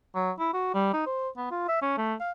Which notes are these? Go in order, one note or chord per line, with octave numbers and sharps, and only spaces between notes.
F#3
E4
F#4
G3
D#4
C5
B3
F4
E5
C#4
A3
F5